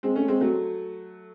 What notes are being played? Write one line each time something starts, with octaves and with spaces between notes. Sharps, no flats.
G#3 C4
A3 C#4
G#3 C4
F#3 A3